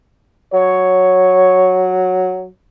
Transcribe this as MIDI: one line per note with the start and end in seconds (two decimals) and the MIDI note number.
0.53 2.47 54
0.53 2.05 73